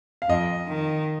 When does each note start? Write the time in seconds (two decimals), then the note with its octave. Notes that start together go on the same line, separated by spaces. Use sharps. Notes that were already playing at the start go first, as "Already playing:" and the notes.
0.22 F5
0.29 F2 D#5
0.68 D#3